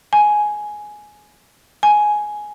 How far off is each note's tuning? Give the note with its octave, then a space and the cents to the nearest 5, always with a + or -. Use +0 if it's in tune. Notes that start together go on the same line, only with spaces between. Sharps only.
G#5 +10
G#5 +10